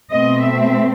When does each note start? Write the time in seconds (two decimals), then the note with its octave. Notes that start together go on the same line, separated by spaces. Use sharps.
0.11 B2 A3 C4 D#5
0.42 E5